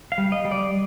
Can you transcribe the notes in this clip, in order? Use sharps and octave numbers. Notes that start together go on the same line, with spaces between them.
F5
G3
D#5
G3
D5